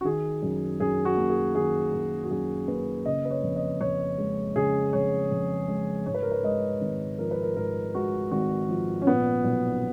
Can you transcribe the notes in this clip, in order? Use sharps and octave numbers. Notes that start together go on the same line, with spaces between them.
F#4
D#3 G#4
F#2
F#2 G#4
F#4
A#3
G#4
D#3 G#4
F#2
F#4
F#2 G#4
A#3 B4
C#3 D#5
B4
C#5
F2
D#5
F2 C#5
G#3
C#3 G#4
F2 C#5
F2
G#3
G#2 C#5
B4
A#4
B4
G#3 D#5
G#1
F3 A#4
B4
A#4
G#2 A#4
G#3 F#4
G#1 F#4
F3
C#4
A#2 B3
B1